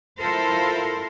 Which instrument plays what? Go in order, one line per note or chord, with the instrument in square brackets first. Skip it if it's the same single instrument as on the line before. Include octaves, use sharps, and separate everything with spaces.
[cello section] E4 F4 A4 A#4 C5